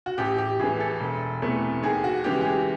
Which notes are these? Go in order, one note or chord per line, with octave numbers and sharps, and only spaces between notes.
F#4
A1 G4
G4
A2 E3 G#4
A4
E1
E2 C3 E3 A3
D#2 G#4
F#4
C#3 E3 G#3 G4
G4
G#4